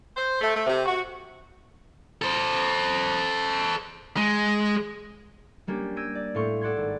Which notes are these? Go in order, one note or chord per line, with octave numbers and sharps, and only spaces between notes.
C5
A3
A3
C3
F#4
A4 C5
G#3
G3 A#3 C#4 D4 G4
E6 G6 G#6 A#6 D7 D#7
D5
A2 A3 C4 F5 C6 C#6
A4 D5 F#5 C6 G#6
G#1